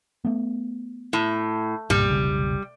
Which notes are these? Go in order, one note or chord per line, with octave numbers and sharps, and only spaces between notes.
A3 B3
A2
C2 G2 A#2 G3
F1 B1 C#3